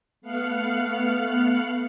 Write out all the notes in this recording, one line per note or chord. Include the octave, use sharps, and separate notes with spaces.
A3 B3 F5 F6 F#6 C#7